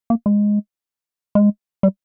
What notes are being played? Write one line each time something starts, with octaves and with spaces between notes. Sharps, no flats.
A#3
G#3
G#3
G3